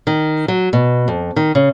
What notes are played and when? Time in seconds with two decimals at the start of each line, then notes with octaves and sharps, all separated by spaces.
0.07 D#3
0.48 F#3
0.73 B2
1.08 F2
1.36 D#3
1.55 C#3